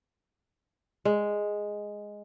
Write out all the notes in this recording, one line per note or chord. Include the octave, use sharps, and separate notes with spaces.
G#3